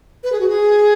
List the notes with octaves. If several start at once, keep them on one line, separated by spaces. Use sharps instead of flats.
B4
G#4
F#4
G#4